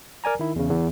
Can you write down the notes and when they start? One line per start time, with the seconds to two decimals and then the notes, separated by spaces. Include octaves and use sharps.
0.24 A#4 D5 G#5 A#5
0.39 D#3 E4
0.56 E2 C#3
0.71 E2